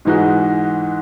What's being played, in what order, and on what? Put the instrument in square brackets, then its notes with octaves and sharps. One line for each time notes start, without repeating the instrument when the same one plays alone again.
[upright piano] G#2 E3 G#3 D#4 F#4